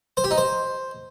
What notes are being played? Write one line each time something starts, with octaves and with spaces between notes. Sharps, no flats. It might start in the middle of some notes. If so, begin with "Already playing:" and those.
C5
G4
D#4
C5